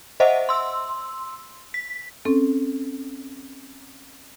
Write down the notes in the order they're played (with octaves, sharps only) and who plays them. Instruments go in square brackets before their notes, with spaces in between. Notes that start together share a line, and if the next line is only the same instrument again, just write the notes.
[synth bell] C5 D#5 E5 F#5
C6 E6
B6
[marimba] C4 C#4 A4